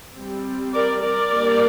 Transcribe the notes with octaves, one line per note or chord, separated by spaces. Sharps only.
G3 C4
A#4 D5
A#4 D5
G3 A#3 D4